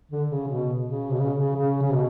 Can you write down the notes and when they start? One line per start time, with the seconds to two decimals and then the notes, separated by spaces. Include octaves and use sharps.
0.11 D3
0.30 C#3
0.48 B2
0.84 C#3
1.12 B2
1.20 C#3
1.38 C#3
1.55 C#3
1.82 C#3
1.92 B2